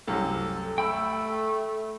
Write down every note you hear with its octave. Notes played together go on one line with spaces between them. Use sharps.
C2 F#2 A4
A3 G5 B5 E6